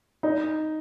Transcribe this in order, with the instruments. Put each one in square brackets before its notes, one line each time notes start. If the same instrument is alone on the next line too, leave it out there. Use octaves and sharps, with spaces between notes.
[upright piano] D#4